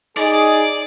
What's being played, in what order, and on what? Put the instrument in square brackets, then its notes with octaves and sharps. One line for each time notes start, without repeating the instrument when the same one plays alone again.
[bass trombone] D#4 [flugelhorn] G#4 [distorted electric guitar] D5 [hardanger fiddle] D6